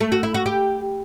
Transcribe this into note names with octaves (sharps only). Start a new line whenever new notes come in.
A3
F#4
E4
F#4
G4